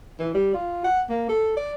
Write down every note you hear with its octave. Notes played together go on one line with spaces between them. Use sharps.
E3
G3
F4
F#5
A#3
A4
D5